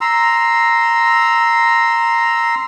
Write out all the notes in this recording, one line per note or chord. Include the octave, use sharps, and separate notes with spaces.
A#5 C6 E6